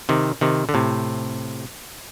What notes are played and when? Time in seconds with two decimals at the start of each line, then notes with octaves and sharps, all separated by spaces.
0.09 C3 D#3
0.41 C3 D#3
0.69 D3
0.74 A2 C3